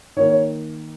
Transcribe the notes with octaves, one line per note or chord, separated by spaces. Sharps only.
D#3 A#3 C#5
C#5